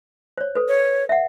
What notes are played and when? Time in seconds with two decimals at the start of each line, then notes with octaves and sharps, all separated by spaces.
0.38 C5 C#5
0.55 A4 B4
0.68 C#5
1.09 E5 F#5